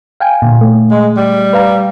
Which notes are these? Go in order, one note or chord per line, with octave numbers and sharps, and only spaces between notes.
F5 G5 G#5
A#2 D3
A3
G#3
G3
B4 F5 A#5